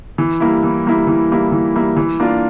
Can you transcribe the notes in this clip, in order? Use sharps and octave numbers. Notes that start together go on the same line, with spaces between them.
E3
G3 A#3 E4
E3
G3 A#3 E4
E3
G3 A#3 E4
E3
G3 A#3 E4
E3
A#3 D4 F4